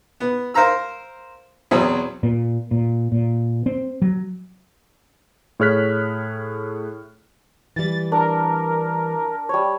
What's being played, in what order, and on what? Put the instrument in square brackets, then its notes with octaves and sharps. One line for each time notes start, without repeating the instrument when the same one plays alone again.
[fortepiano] B3
A#4 C5 F5 A#5 E6
E2 B2 F#3 C4
[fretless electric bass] A#2
A#2
A#2
C4
F#3
[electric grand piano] A2 G#4 C#5 F6 F#6 B6
[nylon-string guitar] E3 G3 [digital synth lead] A6
[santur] D4 [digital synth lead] A#4
[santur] G3 C#5